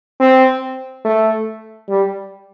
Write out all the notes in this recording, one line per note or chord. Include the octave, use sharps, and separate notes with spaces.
C4
A3
G3